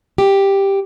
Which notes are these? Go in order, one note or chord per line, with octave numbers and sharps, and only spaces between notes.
G4